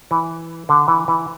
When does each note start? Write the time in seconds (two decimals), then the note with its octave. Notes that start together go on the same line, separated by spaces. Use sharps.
0.11 E3
0.69 D3
0.88 E3
1.08 E3